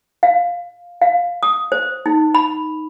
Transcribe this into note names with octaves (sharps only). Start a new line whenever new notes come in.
F5
F5
D#6
C5
D#4
B5